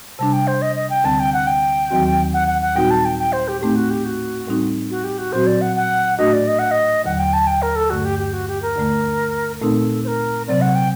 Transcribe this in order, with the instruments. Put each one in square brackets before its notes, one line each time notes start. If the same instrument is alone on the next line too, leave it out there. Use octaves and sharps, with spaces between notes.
[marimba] C3 G3 D4 [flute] A5
[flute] G5
C5
D#5
D#5
G5
[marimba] D2 D3 G3 C4 [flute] A5
[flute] G5
F#5
G5
[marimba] D#2 D#3 F#3 C4 F#4
[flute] F#5
F#5
F#5
[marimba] A#2 G3 C4 D#4 F#4 [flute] G5
[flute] A5
G5
G5
C5
G4
[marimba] A2 A3 C4 D#4 [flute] G4
[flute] F#4
G4
F#4
[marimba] A2 G3 C4 D#4
[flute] F#4
G4
F#4
[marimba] A#2 F#3 C4 F#4 [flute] C5
[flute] D5
F#5
F#5
[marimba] A2 A3 D4 F#4 [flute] D#5
[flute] D5
D#5
F#5
D#5
[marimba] D#2 D3 F#3 [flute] F#5
[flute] G5
A5
G5
A#4
A4
[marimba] G2 D3 A3 [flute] F#4
[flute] G4
G4
F#4
G4
A#4
[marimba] D2 D3 A3
[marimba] A#2 A3 C4 D#4 [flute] A4
[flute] C5
A#4
[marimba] C3 F#3 C4 [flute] D5
[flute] F#5
G5